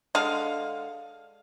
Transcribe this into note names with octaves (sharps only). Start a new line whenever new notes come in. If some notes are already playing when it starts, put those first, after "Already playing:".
D3 G#3 F5